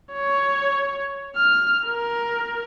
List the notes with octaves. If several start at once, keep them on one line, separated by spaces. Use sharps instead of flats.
C#5
F6
A#4